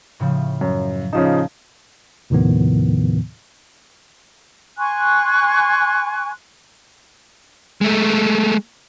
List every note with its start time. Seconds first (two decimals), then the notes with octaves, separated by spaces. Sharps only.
0.20 A2 C#3 F3
0.61 F#2
1.13 C#3 F3 D#4 E7
2.30 D#2 A2 C3 D#3 F3 B3
4.78 G#5 C6 C#6 F#6
7.81 G#3 A3